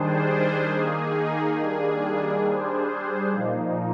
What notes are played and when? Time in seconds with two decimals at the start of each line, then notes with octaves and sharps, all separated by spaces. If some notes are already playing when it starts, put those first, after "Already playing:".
Already playing: D#3 G3 D4 G#4 C5
0.72 D#3 A#3 D#4 G#4
1.60 D#3 G3 A#3 D4 G#4
2.46 G3 D4 G#4 C5
3.32 A#2 F3 A#3 D#4